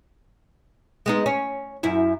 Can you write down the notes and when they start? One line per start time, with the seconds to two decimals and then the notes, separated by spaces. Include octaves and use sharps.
1.06 G#3 B3 D#4
1.26 C#4
1.83 F#2 E4